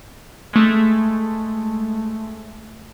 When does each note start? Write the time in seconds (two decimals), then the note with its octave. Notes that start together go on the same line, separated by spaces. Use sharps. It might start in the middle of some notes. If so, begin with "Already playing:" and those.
0.53 G#3 A3